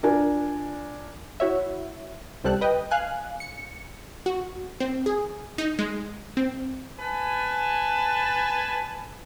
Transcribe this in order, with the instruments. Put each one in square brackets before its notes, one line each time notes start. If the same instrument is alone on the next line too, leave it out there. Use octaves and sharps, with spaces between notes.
[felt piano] D4 F4 A#4 G#5
[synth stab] E4 F#4 C#5 E5
C#2 C3 G3 G4 A4 F#6
B4 D#5 G5
F5 G#5 F#6
C#7
[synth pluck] F#4
C4
G#4
D#4
G#3
C4
[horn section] B4 G#5 A5